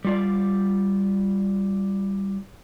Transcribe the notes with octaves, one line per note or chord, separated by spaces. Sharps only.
G3 F4 D5